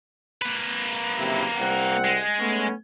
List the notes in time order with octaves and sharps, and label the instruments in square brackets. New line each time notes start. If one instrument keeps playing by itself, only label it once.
[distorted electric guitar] A#3 B4
[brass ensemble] F#1 C3 E4
C2 C4 F#5
[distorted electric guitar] G#3
[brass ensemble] A3 B3 C#4